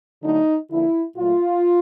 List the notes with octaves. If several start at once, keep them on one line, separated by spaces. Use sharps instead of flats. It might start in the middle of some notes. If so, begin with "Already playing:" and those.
D3 F#3 A3 D#4
D3 F3 A#3 E4
A#2 F#3 A3 F4